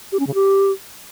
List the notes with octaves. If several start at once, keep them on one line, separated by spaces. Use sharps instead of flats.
G4
C#4
C#3
G4